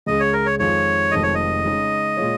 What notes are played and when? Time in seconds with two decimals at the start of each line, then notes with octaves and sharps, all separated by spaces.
0.06 C#2 C#3 G#3 D#5
0.20 C#5
0.33 A#4
0.46 C#5
0.59 F2 D#3 G#3 F4 C#5
1.11 F1 F2 D#3 G#3 D#5
1.23 C#5
1.35 D#5
1.64 C#3 G#3 D#4 G#4 C#5
2.17 A#2 G#3 F4 C#5